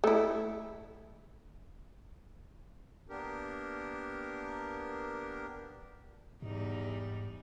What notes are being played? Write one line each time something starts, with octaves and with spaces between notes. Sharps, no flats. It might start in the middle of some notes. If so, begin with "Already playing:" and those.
A3 E4
A#3 B3 D4 G4 A#4
E2 G#2 G3 D#4